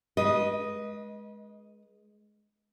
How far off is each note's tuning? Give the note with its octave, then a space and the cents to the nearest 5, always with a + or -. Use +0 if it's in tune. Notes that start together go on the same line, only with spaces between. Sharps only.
G#3 +20 B4 -30 D#5 +0